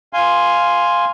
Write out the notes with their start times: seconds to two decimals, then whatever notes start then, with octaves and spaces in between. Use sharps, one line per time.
0.13 F5 G#5 C6